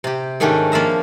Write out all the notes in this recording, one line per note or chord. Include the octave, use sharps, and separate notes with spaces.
C3 G4
G#2 D#3 A3 C#4 D4 G4
F3 A#3 F4 E5 A#5